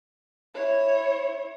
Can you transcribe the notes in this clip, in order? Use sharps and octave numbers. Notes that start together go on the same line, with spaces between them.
E4 C#5